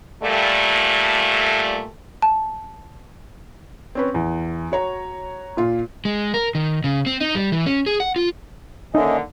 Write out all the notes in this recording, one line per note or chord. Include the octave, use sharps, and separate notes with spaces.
A#2 G3 A3
A5
C4 C#4 B4
E2
F#4 C#5 A#5
A#2 F4
G#3
A#4
D#3
C#3
C4
D#4
G3
E3
C#4
G#4
F#5
F4
D3 D#3 A#3 C#4 D#4 D#5 E5